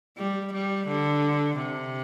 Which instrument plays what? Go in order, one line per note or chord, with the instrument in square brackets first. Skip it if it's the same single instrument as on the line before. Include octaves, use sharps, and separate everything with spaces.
[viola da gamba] G3
G3
D3
C3